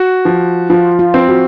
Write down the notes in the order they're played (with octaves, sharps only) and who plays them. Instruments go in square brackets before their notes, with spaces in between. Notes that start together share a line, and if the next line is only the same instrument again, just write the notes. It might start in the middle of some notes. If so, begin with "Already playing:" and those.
Already playing: [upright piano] F#4
F3
[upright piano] F3 [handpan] F4
[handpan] F4
[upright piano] C4
[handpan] F#4